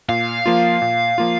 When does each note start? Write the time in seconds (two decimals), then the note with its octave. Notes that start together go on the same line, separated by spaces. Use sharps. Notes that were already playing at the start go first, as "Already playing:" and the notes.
0.09 A#2 F5
0.46 F3 A#3 F4
0.82 A#2
1.18 F3 A#3 F4